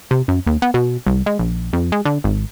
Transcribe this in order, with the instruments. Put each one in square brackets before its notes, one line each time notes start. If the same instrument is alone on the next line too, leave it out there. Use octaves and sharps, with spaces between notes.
[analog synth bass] C3
F#2
D#2
B3
B2
C2
G#3
A#1
F2
G#3
D3
G#1